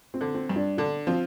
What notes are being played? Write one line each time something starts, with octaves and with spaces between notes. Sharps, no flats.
C4
D3
C4
G2
D4
D3 D4
F3 C4